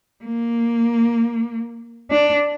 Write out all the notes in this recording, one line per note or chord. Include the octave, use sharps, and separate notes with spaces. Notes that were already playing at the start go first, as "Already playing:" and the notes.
A#3
D4